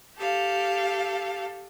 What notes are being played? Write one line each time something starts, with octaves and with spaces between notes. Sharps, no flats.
G4 A4 F5